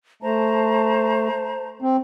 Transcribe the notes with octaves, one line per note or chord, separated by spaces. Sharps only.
A3 C5 A5 A#5
C4